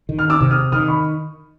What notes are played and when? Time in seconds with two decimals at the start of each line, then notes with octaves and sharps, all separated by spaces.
0.09 D#3
0.19 F6
0.30 D6 E6
0.41 C3
0.51 D#6 F6
0.72 D#3 D#6 F6
0.88 B5 C#6